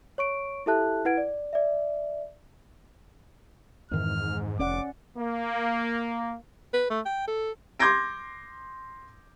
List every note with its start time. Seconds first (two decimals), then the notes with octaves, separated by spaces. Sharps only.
0.18 C#5 C#6 D7
0.66 E4 G4 A4 E5 A5 F#6
1.05 E4 B4 F#5 G#6 D7
1.18 D5
1.53 D5 E5
3.91 F2 G#2 D#3 E3 F6
4.59 F1 C#4 D5 F#5 D6
5.17 A#3
6.74 B4
6.90 A3
7.06 G5
7.28 A4
7.79 C6 D6 G6 G#6 A#6 D7